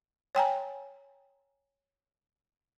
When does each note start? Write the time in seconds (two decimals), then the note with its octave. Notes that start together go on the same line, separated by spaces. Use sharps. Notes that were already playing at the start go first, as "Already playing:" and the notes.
0.35 C#5 G5 G#5 A#5